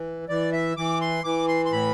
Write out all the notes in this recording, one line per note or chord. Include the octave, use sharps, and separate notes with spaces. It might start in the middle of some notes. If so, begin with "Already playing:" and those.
Already playing: E3
E3 D5
E5
E3 D6
C6
E3 D6
C6
C6
A2 B5